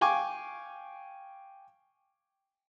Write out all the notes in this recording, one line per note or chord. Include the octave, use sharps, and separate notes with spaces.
F5 G5 G#5 C#6 D6